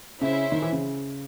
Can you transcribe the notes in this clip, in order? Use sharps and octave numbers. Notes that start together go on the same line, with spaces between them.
C#3 C#4 E4 C5 E5
D#3
E3
C#3